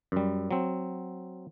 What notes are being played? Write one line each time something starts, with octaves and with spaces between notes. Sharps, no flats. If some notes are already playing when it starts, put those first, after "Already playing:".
F#2 G3
F#3 C4